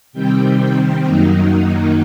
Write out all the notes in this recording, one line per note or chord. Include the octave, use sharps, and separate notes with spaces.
C3 D#3 G3 C4 G5
F#2 D#3 F#3 A#3 D#4